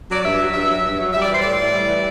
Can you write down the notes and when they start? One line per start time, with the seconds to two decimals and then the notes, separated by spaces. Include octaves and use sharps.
0.09 F#3 D5
0.24 G2 E5
0.39 F#3
0.54 G2 E5
0.69 F#3
0.83 G2
0.99 F#3
1.13 G3 E5
1.22 D5
1.29 E3 C5
1.40 A2 D5
1.59 A2
1.73 G3
1.88 E3